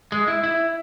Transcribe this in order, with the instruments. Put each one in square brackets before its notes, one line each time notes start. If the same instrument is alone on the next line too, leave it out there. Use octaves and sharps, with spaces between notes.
[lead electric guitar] G#3
E4
E4